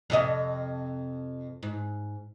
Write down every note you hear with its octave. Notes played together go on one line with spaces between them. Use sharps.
F2 C3 D#5
G#2